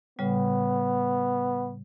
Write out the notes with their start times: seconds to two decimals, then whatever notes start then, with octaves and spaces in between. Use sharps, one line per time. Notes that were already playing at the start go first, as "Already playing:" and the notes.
0.19 A2 C#3 G3 B3